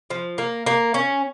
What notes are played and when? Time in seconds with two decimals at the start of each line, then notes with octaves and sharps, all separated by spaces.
0.10 F3
0.38 A#3
0.66 A#3
0.94 C#4